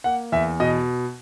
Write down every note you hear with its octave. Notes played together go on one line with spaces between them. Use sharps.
A#3 F#5
E2 E5
B2 D#5